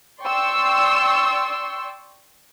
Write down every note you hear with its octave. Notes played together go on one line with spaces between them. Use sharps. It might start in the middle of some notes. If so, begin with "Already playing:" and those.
D5 G5 C6 C#6 E6